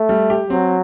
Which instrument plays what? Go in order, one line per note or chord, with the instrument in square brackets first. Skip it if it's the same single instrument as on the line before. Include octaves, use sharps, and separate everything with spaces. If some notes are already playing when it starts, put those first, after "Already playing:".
Already playing: [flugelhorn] A3
[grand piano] G3
G4
[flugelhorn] F#3 [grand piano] C4